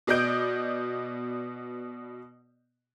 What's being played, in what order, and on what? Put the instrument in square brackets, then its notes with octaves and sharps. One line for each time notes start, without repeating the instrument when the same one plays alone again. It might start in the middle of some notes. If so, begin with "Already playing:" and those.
[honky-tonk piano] B2 B3 D5 D#5 G6 D7